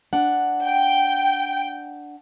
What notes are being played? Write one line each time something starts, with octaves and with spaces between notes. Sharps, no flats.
D4 F#5
G5